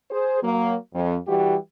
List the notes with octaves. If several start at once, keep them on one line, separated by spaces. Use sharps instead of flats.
G#4 C5
F#3 A#3
F2
E3 G3 F#4 G4